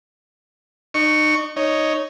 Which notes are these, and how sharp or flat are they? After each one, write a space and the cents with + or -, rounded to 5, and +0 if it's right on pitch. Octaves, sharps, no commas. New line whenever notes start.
D#4 -35 C#6 +0
D#4 +0 C#5 +0